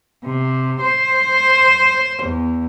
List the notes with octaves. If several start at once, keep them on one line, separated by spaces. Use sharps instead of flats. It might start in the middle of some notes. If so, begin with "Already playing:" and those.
C3
C5
E2